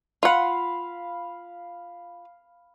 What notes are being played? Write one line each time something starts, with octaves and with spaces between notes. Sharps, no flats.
F4 F5 F#5 B5